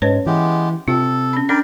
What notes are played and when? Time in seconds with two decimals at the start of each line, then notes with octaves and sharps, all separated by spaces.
0.02 G#2 C#4 B4 C#5
0.26 E3 G#3 B3 G4
0.88 C3 F4 A4
1.33 C#4 B5
1.49 C#4 D4 A#4 D5 G5 B5